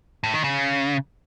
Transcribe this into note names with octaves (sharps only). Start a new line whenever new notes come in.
A2
D#3
C#3